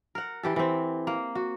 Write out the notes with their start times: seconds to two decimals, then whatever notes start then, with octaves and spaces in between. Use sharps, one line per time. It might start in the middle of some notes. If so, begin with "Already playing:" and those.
0.15 A#4 F#5
0.43 E3 G4 A4
0.56 E3 C4
1.07 A#3
1.35 F#4